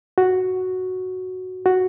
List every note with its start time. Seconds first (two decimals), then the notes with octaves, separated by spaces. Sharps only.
0.18 F#4
1.66 F#4